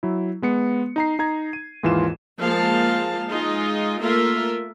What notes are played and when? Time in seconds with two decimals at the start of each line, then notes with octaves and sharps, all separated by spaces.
0.03 F#3 E4
0.42 G#3 B3 C#7
0.96 D#4 A#5 C7
1.19 D#4 A#5 G#6
1.53 D#7
1.83 D#2 G#2 E3 F4 C6 E7
2.39 F3 G#3 A#3 F4 F5 A5
3.30 G#3 D#4 F4 D#5
4.01 A3 A#3 F4 A#4 E5